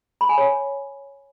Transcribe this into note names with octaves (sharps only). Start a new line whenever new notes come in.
B5
G#5
C#5